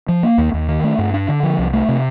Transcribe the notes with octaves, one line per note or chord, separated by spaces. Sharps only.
F3
A#3
D#2
D#2
D#3
A3
G2
D4
D3
F3
C2
A3
C3